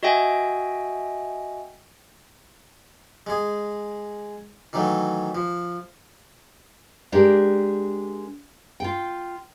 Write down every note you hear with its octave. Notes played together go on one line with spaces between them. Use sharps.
F#4 D#5 E5 G5 G#5
G#3 G#4
D#3 E3 F#3 A3
F3
G#3 D4 G4 A#4
F4 G5